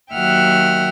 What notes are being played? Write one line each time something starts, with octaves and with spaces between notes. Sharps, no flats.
D#2 F#3 E5 F#5 G5 F6